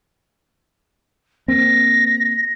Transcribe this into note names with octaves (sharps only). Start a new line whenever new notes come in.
A#3 C4 A#6